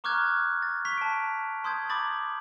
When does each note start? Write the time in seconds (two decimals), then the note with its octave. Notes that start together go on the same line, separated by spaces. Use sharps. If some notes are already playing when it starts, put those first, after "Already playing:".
0.04 A#5 C#6 D6 F6 F#6 G#6
0.62 A6
0.85 C#6 B6 F7
0.98 A5 D7
1.64 A5 C6 D#6 G6 G#6
1.89 A#5 B5 D6 D#6 A6 F#7